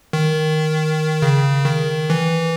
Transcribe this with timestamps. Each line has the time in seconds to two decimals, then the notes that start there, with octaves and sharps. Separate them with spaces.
0.13 D#3
1.22 C#3
1.65 D#3
2.10 E3